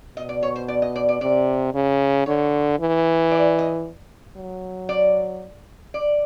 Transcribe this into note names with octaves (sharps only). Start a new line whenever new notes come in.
B2 D#5
D5
C#5
C5
D5
D#5
D5
D5
C3 D5
C#3
D3 C#5
E3
D5
D#5
F#3
D5
D5